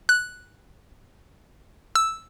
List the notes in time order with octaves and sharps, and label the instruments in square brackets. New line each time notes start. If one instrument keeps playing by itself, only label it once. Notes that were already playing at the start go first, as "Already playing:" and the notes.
[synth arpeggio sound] F#6
E6